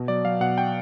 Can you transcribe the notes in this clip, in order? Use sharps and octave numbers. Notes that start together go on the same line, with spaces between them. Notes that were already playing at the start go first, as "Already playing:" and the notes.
Already playing: B2
F#3 D5
F#3 F5
B2 F#5
G5